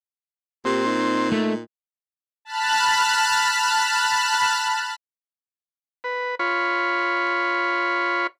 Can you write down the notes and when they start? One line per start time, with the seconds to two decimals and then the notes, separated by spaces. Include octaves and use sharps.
0.65 A#2 C4 G4
0.86 D#4
1.32 A3
2.45 A5 B5 F6 F#6
6.04 B4
6.39 F4 C#5 B5